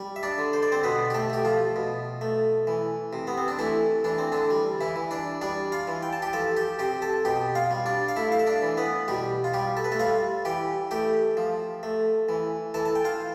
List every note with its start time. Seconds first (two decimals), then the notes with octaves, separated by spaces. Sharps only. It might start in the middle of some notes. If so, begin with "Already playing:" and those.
Already playing: G3
0.16 E5
0.23 D4 D5
0.38 D3
0.53 C5
0.63 D5
0.72 C4 C5
0.84 B2 B3 B4
1.10 G4
1.14 A3 A4
1.30 A3 G4
1.45 F3 F4
1.76 B2
2.21 A3
2.67 E3
3.13 C3
3.27 B3
3.38 C4
3.48 D4
3.59 E3 A3 E4
4.04 E3 D4
4.18 C4
4.32 D3 D4
4.50 G3
4.81 E3 E4
4.96 E3
5.11 D4 D5
5.41 G3 D4 D5
5.72 F4 F5
5.87 E3
6.03 G5
6.13 A5
6.22 G4 G5
6.33 F3 A4 A5
6.56 G4 G5
6.79 C3 G4 G5
7.02 A4 A5
7.25 B2 G4 G5
7.55 F4 F5
7.71 G3
7.86 D4 D5
8.08 F5
8.16 A3 E4 E5
8.32 F5
8.39 E5
8.47 D4 D5
8.62 E3
8.77 B3 B4
9.08 B2 G3 G4
9.44 F4
9.54 G3 G4
9.77 A4
9.84 B4
9.92 A3 A4
10.00 G3 F4 F5
10.45 E3 G4 G5
10.91 A3 G4 G5
11.37 F3
11.83 A3
12.29 E3
12.74 E3 A4 A5
12.86 A5
12.95 G5
13.05 F4 F5